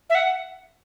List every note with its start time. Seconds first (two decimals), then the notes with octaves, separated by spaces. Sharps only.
0.10 E5
0.15 F#5